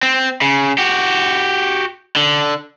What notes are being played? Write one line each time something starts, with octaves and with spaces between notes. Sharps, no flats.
C4
C#3
F#4 G4
D3